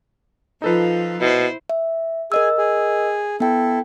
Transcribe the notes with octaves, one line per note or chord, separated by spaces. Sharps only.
F3 D#4 F4 A4 B4
B2 E4 C5
E5
G#4 A#4 D#5 G#5 E6
G#4
B3 E4 A4 G5